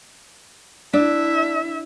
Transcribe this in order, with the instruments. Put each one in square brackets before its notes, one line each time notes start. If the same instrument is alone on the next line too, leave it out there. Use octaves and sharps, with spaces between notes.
[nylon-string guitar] D4 [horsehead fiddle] E4 E5